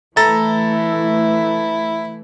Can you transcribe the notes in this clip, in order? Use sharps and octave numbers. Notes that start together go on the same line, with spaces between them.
E3 A3 E4 A4 A#5 A6